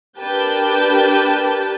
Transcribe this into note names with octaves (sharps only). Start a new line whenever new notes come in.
D4 G4 A#4 B4 G5 A5